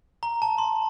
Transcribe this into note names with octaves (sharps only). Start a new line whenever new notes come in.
A#5
A5
C6